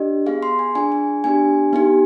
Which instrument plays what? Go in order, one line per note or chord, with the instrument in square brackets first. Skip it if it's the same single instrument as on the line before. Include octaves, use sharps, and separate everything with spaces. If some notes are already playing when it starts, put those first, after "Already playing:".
Already playing: [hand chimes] D4 G4 D#5
B3 F4 G#4 F5
C6
G#5
D4 F4 G#4 G#5
G#5
B3 D4 G4 G#5
B3 D#4 G4